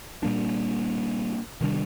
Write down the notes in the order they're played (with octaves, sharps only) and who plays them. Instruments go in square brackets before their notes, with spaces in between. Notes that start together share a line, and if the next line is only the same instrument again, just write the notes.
[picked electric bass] A#2 G3 A#3 D4
C3 D#3 G3 D4